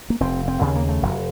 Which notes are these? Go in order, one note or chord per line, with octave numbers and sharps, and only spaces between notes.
A#3
F1 C4
C4
D#2 C#3
A#3
A3
F1 F#3